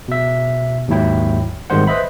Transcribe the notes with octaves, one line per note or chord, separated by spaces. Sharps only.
B2 E5
D#2 G#2 F#3 E4 G5
G#1 D#3 G3 G#3 C5 F#5
B4 C5 D#5 E5 B5